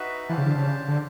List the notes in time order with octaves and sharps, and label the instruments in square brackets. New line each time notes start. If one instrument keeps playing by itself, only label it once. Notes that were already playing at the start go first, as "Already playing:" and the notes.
Already playing: [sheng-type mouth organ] D#4 F#4 B4 E5
[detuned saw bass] E3 [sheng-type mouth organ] D4 G4 C5 F5 A5
[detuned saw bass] C#3
D3
C#3
D3